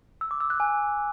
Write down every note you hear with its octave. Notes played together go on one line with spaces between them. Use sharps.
E6
D6
E6
F#6
G#5